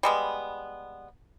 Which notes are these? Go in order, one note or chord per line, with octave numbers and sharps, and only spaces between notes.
G3 G#3 B3